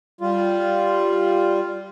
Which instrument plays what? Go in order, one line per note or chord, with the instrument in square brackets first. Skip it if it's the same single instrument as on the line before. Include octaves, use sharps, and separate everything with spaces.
[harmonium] G3 F4